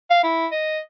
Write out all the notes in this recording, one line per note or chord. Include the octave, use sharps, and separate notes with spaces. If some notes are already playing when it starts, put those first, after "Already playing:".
F5
E4
D#5